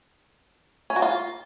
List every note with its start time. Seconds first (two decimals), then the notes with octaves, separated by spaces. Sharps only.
0.90 C#4
0.96 F#4
1.02 F4